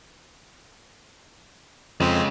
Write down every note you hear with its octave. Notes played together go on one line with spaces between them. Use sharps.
F2 C#3 G#3 C4